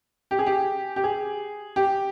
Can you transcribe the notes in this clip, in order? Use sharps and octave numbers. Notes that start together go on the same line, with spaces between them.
G4
G#4
G4
G4
G#4
G4